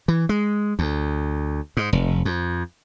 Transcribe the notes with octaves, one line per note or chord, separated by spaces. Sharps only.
E3
G#3
D2
G#2
F1
F2